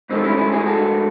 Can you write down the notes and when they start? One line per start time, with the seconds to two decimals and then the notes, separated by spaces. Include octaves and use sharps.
0.09 G#2 F#3 A3 C4 D#4
0.24 C#4 E4
0.37 C#4 E4
0.52 E4 G#4
0.66 F#4 A4